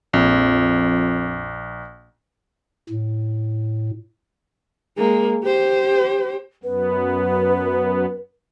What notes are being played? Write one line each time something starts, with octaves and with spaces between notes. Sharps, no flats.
A#1 F2
A2
G#3 A#3
G4 C5
F#2 B3 B4